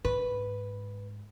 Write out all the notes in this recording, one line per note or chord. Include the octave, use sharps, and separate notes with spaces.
G#2 B4